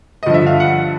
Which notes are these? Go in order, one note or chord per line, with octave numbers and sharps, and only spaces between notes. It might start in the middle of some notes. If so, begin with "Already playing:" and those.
G2 D3 F3 D#5
E5
F5
F#5